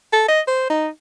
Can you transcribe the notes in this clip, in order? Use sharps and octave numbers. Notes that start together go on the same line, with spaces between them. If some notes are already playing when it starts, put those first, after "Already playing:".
A4
D#5
C5
D#4